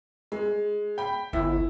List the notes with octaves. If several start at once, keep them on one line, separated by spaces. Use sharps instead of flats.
G#3
G5 B5
G1 E4